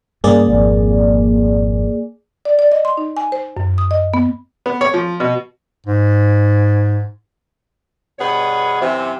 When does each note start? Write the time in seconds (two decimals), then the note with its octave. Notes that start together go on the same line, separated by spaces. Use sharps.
0.24 G2 C#3 A#3 G#4 D5
0.49 G#1 F2
2.45 D5
2.59 D5
2.72 D#5
2.85 C6
2.97 D#4
3.17 G#5
3.32 C5
3.57 F#2
3.78 D#6
3.91 D#5
4.14 B3
4.66 B3
4.81 C#5
4.94 F3
5.20 B2
5.86 G#2
8.19 G2 B2 B3 G#4 C#5 B5
8.81 F#2 C3 E3